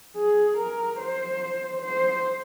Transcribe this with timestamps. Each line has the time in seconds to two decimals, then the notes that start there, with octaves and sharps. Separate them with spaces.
0.17 G#4
0.58 A#4
1.00 C5
1.82 C5